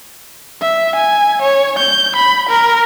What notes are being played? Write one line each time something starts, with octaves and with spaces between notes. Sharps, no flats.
E5
G#5
C#5
G6
B5
A#4